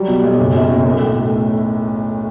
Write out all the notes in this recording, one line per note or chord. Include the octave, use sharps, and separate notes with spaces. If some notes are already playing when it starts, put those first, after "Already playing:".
Already playing: F#3 G3
B2
B1
F#1
F#2
F#1
B1
A2
A3